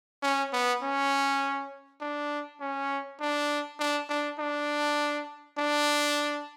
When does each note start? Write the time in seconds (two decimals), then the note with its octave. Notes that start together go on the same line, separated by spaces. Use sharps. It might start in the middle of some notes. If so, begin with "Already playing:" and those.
0.23 C#4
0.53 B3
0.83 C#4
2.01 D4
2.60 C#4
3.20 D4
3.79 D4
4.09 D4
4.39 D4
5.58 D4